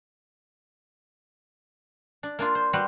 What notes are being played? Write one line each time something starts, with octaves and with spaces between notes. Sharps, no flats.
D4
A#3 D4 F4
C5
G3 F#4 B4 C5